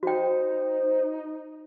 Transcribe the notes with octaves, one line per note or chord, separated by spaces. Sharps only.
D#4 F#4 C5 G5